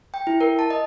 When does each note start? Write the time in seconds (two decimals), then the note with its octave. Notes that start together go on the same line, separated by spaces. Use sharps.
0.14 G5
0.27 E4
0.41 A#4
0.59 A5
0.71 D#5